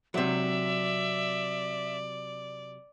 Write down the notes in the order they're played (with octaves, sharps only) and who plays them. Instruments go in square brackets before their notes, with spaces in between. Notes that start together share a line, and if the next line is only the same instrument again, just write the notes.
[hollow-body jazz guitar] C3 F#3 [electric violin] D5 [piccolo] E5